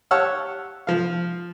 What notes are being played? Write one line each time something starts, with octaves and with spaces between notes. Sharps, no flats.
G4 C#5 F#5 A5 E6 F6
F3 F5